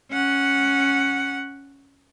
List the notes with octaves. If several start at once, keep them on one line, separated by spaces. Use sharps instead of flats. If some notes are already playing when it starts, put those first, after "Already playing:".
C#4 F#5